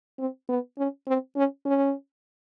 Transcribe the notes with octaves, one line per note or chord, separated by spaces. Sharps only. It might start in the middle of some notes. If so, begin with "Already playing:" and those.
C4
B3
C#4
C4
C#4
C#4